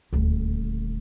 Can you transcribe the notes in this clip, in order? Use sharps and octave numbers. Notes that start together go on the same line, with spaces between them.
D#1 D2